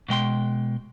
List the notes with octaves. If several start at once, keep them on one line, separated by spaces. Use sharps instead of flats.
B2 G#3 G5 C6